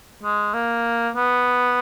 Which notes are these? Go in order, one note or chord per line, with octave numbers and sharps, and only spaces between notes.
G#3
A#3
B3